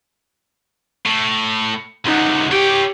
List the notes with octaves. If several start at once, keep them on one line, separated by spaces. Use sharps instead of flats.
A2
C#2 C3 D#4 F#5
G4 C#5 G5